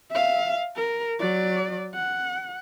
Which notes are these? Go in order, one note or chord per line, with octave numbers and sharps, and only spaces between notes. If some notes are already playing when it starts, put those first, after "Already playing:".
E5 F5
A#4
F#3 D5
F#5